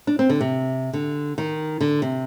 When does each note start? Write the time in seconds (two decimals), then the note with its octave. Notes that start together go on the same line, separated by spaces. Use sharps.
0.07 D4
0.19 C4
0.29 D3
0.41 C3
0.93 D3
1.38 D#3
1.81 D3
2.02 C3